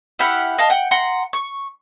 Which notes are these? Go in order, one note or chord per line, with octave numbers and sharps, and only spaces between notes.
E4 G4 F#5 F6
D#5 F5 A5
F#5 G5
F#5 A#5 C6
C#6